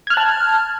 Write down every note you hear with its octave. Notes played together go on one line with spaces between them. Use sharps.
A5 F6 F#6 G#6